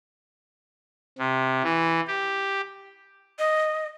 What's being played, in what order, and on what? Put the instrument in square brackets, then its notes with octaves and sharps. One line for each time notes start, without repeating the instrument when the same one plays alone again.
[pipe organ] C3
E3
G4
[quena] D#5